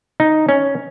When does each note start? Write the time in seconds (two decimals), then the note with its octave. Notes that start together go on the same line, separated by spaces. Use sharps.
0.20 D#4
0.49 C#4